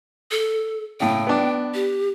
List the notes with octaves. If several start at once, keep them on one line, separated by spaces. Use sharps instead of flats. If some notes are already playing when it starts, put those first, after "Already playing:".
A4
A2 C#3 G5
B3 D4
G4